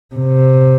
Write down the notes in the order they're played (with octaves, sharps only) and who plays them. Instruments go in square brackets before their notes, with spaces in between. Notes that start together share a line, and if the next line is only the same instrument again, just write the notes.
[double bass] C3